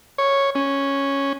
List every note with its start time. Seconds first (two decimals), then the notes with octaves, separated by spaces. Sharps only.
0.18 C#5
0.55 C#4